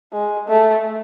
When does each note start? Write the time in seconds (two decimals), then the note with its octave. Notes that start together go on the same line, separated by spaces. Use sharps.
0.13 G#3
0.48 A3